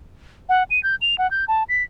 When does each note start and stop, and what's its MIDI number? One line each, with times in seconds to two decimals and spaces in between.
0.49 0.63 78
0.70 0.82 99
0.83 0.95 91
1.01 1.18 101
1.18 1.29 78
1.31 1.45 91
1.48 1.63 81
1.69 1.83 95